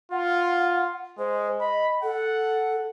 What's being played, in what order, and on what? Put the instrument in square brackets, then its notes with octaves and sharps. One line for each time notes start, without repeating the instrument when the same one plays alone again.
[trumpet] F4 [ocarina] F#5
[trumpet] G#3 [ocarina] C5
[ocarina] D#5 [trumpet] B5
[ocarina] A4 [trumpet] F#5